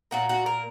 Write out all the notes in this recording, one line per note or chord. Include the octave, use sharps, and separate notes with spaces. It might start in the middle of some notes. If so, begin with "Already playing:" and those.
A#2 A#3 F#4
F#4
A#4